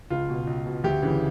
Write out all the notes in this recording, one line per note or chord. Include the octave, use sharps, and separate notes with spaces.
C#2 F4
B2
C#2
B2
D2 G4
C#3 E3